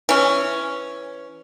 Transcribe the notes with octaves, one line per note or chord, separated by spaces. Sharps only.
E3 C#4